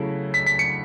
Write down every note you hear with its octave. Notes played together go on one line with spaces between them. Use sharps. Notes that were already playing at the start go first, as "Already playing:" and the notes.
Already playing: C#3 F#3 A3 E4
B6
B6
C#7